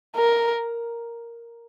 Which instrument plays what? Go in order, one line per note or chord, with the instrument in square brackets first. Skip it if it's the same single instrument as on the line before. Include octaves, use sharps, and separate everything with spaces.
[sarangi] A#4